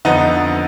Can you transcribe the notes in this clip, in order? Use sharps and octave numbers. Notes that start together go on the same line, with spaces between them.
F2 D3 B3 D#4